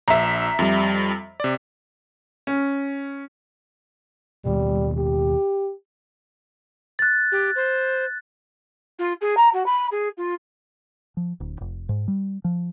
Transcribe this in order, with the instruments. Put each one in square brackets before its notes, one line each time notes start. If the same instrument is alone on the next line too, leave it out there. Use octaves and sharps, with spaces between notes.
[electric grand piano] A#1 [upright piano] E5 A#5
[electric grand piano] F2 G3
C3 D5
[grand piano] C#4
[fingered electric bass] D#2 B2 [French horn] G3
[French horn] G4
[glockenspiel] F#6 A6
[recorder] G4
C5
F4
G#4
A#5
F#4
B5
G#4
F4
[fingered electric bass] F3
D1
F1
G#2
G3
F3